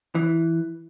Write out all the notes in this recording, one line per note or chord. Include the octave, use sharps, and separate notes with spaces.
E3